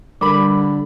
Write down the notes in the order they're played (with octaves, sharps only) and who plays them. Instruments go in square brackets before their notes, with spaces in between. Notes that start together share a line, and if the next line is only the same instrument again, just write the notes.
[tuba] D3 [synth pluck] G3 B5 [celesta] A#4 D6